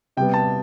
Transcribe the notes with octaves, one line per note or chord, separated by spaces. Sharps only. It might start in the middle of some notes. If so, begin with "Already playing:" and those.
C3 G3 B3 G5
A5